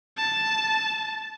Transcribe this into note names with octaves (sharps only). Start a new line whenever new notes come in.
A5